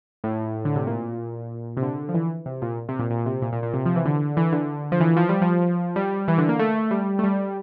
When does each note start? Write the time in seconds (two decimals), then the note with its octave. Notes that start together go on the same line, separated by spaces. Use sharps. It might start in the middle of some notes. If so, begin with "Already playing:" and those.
0.24 A2
0.65 D3
0.76 C3
0.87 A#2
1.77 C3
1.83 D3
2.09 F3
2.15 E3
2.46 C3
2.62 A#2
2.89 C3
2.99 A#2
3.10 A#2
3.26 C3
3.42 A#2
3.52 A#2
3.63 A#2
3.73 C3
3.86 F3
3.96 E3
4.05 D3
4.37 E3
4.52 D3
4.92 F3
5.00 E3
5.17 F3
5.29 G3
5.42 F3
5.96 G3
6.28 E3
6.38 D3
6.49 A#3
6.59 A3
6.91 G3
7.19 A3
7.24 G3